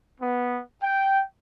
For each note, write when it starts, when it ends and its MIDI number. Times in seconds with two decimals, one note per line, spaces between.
0.20 0.58 59
0.81 1.21 79